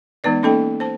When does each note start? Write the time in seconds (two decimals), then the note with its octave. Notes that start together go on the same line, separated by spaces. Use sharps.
0.24 E3 G#3 B3 D#4 B4 D5
0.43 A#3 C#4 D#4 A4 D#5 G5
0.80 C5 A5